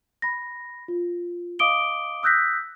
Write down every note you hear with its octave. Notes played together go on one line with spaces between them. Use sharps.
B5 A#6
F4
D#5 F5 D6 D#6 D7 G7
D#6 E6 F#6 G6 A#6 B6